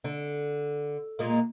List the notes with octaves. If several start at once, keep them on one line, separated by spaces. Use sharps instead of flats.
D3
A#2 G#3 A#3